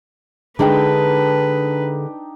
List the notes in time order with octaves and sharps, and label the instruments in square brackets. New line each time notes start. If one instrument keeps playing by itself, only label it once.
[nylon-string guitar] D3 G#3 [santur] D4 D#4 G5 [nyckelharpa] B4